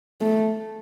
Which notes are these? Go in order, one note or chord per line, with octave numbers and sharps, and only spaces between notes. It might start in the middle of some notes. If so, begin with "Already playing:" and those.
A3